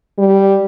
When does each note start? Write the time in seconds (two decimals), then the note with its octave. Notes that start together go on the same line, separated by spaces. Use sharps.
0.18 G3